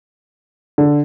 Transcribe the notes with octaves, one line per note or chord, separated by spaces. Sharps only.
D3